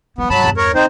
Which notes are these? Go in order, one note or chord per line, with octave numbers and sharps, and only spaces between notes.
F3 F#3 B3
G2 C3 F#3 A5 B5
E2 G2
A#4 C#5
C#3 C4 D#4 C5